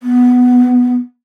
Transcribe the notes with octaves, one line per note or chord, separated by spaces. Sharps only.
B3